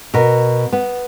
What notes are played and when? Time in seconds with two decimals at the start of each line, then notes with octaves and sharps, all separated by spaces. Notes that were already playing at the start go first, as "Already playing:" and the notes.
0.14 B2 A#4
0.73 B3